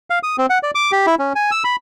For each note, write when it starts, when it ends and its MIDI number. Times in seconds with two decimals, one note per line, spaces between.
0.10 0.19 77
0.23 0.36 87
0.38 0.46 60
0.50 0.59 78
0.63 0.71 74
0.75 0.92 86
0.92 1.06 67
1.07 1.15 64
1.19 1.33 61
1.35 1.51 80
1.51 1.63 88
1.64 1.76 83